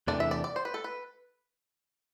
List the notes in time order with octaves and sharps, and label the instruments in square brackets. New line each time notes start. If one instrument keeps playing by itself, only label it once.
[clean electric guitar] E2 C3 E3 A3 D4 [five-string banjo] D5
[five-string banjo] E5
D5
D5
C5
B4
A4
B4